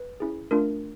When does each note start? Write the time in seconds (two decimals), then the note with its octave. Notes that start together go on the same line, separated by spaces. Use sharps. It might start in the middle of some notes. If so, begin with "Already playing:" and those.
Already playing: B4
0.20 C#4 E4 G#4
0.51 A3 D4 F4 A#4